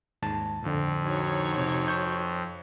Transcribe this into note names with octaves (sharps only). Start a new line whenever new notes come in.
D#2 G#2 A5
F2 A2 D3
D#4 F#4 C#5
C3
C#6 G6